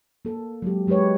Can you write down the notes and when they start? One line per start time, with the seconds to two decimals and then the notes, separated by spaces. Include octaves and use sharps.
0.25 A#3 A4
0.62 F#3 G#3 G4
0.87 F#3 G#3 G4 B4 C#5